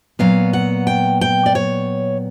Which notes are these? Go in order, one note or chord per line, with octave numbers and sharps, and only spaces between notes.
A#2 F#3 B3 F5
F#5
G5
G5
D5
C#5